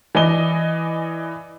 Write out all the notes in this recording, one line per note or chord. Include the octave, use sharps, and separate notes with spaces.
E3 D5 D#5 G#5 G7